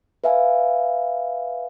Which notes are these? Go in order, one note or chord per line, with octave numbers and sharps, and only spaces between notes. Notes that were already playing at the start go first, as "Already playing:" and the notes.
B4 E5 F5 G#5